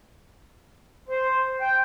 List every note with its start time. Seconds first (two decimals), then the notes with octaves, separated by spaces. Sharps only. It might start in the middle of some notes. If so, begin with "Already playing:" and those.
1.09 C5
1.61 G5